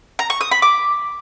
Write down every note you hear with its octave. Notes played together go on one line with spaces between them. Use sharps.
A#5
C#6
D#6
B5
D6